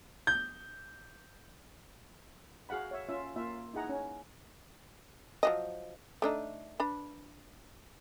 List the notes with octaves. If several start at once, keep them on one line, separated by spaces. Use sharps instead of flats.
G6
F#4 G#4 F5 F#5 B5
C#5 E5
C#4 F4 E5
A#3 F4 E5
D#4 E4 G#4 F#5 A#5
C#4
F3 F#3 D#5
A3 D4 D#4
D4 B4 B5